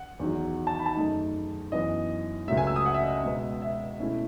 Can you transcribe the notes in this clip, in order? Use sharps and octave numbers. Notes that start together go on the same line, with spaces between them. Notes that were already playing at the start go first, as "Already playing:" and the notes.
Already playing: F#5
E2 D#3 F#3
A5
B5
A5
F#2 D#3 A3 D#4
F#2 E3 B3 D#5
C#2 C#3 F#3 A3 E5
G#5
E6
D#6
F#5
E5
D#5
E5
B2 G#3 B3
E5
B2 A3 C#4 E4